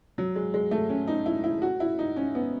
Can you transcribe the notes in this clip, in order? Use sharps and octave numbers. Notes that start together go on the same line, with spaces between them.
F#3
G#3
G#3
A3
C#4
D#4
E4
E4
F#4
E4
D#4
C#4
B3